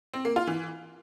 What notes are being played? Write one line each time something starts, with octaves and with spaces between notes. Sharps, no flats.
C4
A#3
F4
E3